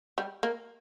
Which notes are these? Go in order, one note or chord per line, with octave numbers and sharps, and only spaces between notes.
G3
A#3